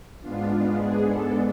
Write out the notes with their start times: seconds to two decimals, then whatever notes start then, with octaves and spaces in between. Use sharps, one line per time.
0.21 G#2 G#3 B3 D4 F4
0.49 F4
0.77 G#4
1.05 A4